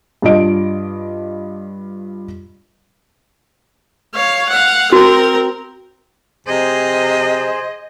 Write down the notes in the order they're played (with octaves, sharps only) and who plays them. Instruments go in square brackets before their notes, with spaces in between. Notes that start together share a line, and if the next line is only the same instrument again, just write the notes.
[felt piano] G2 D4 F4 D#5 D7
[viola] C#5 F5
F5 F#5
[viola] C4 A#4 [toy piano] F#4
[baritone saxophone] C3 [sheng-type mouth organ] G#4 C5 [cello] D#5